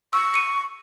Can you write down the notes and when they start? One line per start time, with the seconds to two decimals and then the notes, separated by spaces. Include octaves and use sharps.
0.13 C#6 E6
0.34 C#7 D#7